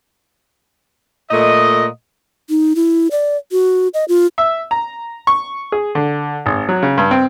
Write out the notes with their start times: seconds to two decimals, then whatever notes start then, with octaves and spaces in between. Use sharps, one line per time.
1.31 A#2 A3 D#5
2.49 D#4
2.75 E4
3.11 D5
3.52 F#4
3.94 D#5
4.08 F4
4.38 E5
4.71 A#5
5.27 C#6
5.72 G#4
5.95 D3
6.46 G#1
6.69 F#3
6.83 C#3
6.98 G2
7.11 C4